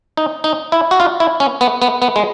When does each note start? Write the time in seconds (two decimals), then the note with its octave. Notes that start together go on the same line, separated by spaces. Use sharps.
0.17 D#4
0.44 D#4
0.72 E4
0.91 F#4
1.00 F4
1.20 E4
1.40 C#4
1.61 B3
1.82 B3
2.02 B3
2.16 G#3